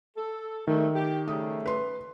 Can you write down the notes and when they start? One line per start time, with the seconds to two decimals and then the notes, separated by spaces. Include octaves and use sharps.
0.17 A4
0.67 G#2 D#3 G3 A3
0.95 G4
1.28 C#3 G3 A3 D#6
1.66 B4 C6